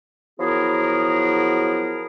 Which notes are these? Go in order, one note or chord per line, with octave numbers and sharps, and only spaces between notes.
F3 F#3 B3 E4 G#4 A#4